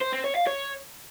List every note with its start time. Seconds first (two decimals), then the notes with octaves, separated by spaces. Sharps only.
0.02 C5
0.13 C4
0.24 C#5
0.36 F5
0.47 C#5